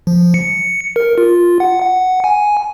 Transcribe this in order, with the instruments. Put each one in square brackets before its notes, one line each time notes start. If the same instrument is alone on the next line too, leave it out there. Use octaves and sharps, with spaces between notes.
[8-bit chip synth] F3
C#7
A#4
F4
F#5
F#5
G#5